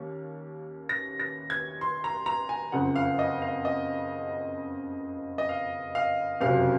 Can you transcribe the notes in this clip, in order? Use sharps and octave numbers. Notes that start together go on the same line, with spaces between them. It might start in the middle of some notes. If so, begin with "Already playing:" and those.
Already playing: D#2 A#3 C#4
A#6
A#6
G#6
C6
A#5
A#5
G#5
F#1 F2 C#3 F3 F#5
F5
D#5
F5
D#5
D#5
F5
F5
F#1 F2 C3 F#3 C#4 F5